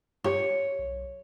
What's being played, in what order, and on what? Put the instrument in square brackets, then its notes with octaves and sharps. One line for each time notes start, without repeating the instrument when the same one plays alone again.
[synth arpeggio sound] G2 F4 G4 [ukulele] C#5
[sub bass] B1